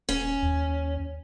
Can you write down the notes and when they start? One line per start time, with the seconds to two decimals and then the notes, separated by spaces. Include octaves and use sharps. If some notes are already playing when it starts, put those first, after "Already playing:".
0.09 D#1 C#4
0.42 D#2